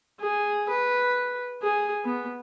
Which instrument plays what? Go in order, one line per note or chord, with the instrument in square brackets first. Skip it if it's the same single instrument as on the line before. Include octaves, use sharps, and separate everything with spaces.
[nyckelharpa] G#4
B4
G#4
B3